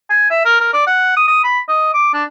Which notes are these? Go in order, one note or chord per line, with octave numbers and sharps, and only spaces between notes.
G#5
E5
A#4
A#4
D5
F#5
D#6
D#6
B5
D#5
D6
D4